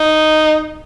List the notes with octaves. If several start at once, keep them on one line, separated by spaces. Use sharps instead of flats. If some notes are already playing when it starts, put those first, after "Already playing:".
Already playing: D#4